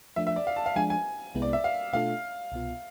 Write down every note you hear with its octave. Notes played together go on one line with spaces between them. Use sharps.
F3 A3 D4 E5
E5
D5
F5
A5
F5
F3 G#3 D4 G#5
G#5
C2 C3 G#3 B3 E4
D5
E5
F5
B2 A3 D4 F4 A4 F5
C2 B2 B3 F4